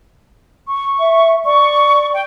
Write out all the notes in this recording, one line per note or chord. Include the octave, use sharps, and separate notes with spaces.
C#6
E5
D5 C#6
G5